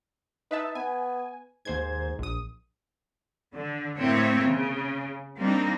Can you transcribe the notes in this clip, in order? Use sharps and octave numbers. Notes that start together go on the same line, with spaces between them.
D#4 B4 E5 A5
B3 G#5
D#2 G#2 C5 G#6
A#1 D#6
D3
A2 A#3 C4 C#5 E5
C#3
G3 A#3 C4 D4 D#4